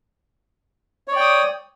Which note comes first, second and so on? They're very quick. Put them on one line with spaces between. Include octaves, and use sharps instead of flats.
C#5 D5 G5 D#6